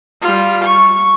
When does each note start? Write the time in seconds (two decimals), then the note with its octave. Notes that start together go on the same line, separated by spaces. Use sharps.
0.21 G3 F4
0.63 C#6